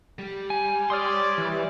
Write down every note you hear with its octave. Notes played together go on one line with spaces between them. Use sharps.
G3
G#5
C#5 D5 C6 D#6 F6
E3